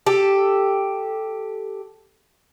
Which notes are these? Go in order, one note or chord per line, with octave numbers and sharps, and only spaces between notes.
G4 A4